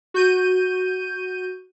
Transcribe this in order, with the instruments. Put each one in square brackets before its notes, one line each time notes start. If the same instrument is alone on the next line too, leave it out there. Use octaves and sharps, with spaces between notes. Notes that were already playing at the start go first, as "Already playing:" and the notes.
[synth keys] F#4 G6 D#7